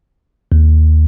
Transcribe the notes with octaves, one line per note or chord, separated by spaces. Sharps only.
D#2